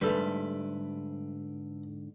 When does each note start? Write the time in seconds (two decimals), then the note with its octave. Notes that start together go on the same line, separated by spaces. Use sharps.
0.01 G#2 D3 G3 A3 A4 B4